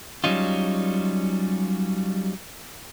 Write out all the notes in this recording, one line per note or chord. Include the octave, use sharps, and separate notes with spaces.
F#3 G3 C#4 D#4 F4